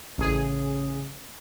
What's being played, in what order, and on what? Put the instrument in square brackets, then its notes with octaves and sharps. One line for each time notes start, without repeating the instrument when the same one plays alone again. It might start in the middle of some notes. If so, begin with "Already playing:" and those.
[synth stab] A1 G#4 [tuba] C#3